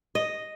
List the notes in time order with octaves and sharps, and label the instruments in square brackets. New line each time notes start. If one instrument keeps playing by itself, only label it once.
[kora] D#5